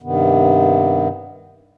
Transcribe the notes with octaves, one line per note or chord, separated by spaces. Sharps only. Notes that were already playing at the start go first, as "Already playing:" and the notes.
G2 C3 D#3 B3